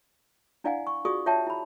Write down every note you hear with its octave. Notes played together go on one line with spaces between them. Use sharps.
D4 E4 D5 F5 F#5 G#5
C#6
F4 F#4 G#4 D5 C#6 D#6
F4 C#5 E5 G5 A5
E4 B5